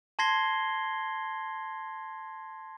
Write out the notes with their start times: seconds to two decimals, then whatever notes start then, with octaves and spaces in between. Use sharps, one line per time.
0.19 A5 C6 G#6 A#6 C7 G7